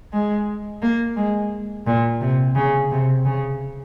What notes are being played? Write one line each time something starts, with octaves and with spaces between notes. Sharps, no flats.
G#3
A#3
G#3
A#2
C3
C#3
C3
C#3